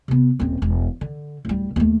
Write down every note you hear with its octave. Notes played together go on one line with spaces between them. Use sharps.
C3 B3
D#1 C4
E1
D3
D1 G3
D#2 A3